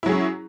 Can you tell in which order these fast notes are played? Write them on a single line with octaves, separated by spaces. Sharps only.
E4 F#3 G#4 C#4